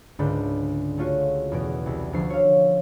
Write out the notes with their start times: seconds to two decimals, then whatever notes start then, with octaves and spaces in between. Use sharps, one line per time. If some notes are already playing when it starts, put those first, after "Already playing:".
0.19 C#2 G#2 D3 D4 B5 G6
0.98 A3 C#4 F4 F#4
1.52 E2 B2 D7
1.86 C2
2.13 D2 F3 C7
2.30 C#5 F5